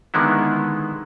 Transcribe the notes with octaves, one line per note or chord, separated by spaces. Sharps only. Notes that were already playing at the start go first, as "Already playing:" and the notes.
D3 D#3 G#3 B3 E4